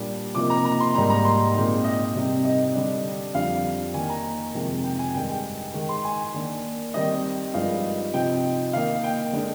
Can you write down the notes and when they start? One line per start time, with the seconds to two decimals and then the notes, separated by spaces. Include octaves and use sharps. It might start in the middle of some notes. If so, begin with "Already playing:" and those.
Already playing: A#2 G3 D4
0.35 C3 F3 A#3 D#4 D6
0.50 A#5
0.65 A#5
0.80 C6
0.95 G#2 G3 A#3 D#4 A#5
1.10 A#5
1.25 C6
1.54 A#2 G#3 C4 D#4
1.84 D#5
2.15 C3 G3 C4 D#4
2.45 D#5
2.74 D3 G3 D4
3.34 F2 D3 G3 F5
3.94 D#3 A#3 D#4 G#5
4.09 A#5
4.54 F2 C3 D#3 G#3
4.84 G5
4.99 G#5
5.14 G2 D#3 G#3 D#4 G5
5.29 G5
5.74 D#3 G#3 D#4
5.89 C6
6.04 G#5
6.34 D#3 A#3 D4
6.94 D#3 G3 C4 D#4 D#5
7.53 G2 F3 G#3 D#4 F5
8.14 C3 F3 C4 D#4 G5
8.73 D#3 A#3 D#4 F5
9.04 G5
9.33 D3 G#3 D#4